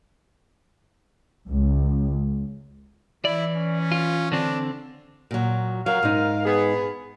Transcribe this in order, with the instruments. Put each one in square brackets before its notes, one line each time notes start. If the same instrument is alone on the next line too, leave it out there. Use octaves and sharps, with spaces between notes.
[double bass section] C#2
[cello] E3 [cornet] E4 [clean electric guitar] D5
[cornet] C#4
[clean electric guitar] F4
[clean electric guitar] D3 C4 [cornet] D4
[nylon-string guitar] A#2 F#3
[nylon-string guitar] F#3 [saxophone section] A#4 F5
[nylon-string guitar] G#2 D#4
[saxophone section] B3 G#4